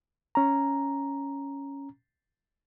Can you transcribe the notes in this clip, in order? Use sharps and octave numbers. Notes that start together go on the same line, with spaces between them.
C#4 A#5